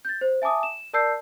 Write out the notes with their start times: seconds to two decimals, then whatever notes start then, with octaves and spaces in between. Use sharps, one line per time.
0.05 G6 A6
0.21 C5
0.42 E5 G#5 A5 D6 D#6
0.63 E7
0.93 A#4 D5 A5 E6 G6 C7